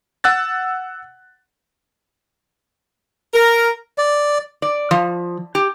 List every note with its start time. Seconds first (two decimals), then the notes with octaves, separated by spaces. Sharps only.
0.24 F#5 E6 F#6 A6
3.34 A#4
3.98 D5
4.62 D5
4.91 F3
5.55 G4